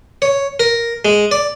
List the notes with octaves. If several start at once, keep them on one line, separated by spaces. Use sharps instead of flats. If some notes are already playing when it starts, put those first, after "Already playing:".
C#5
A#4
G#3
D5